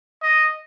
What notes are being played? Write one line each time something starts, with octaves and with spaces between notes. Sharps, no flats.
D#5